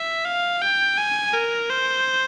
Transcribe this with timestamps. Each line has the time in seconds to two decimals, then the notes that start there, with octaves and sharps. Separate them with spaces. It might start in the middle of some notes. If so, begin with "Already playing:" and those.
Already playing: E5
0.24 F5
0.61 G5
0.97 G#5
1.33 A#4
1.70 C5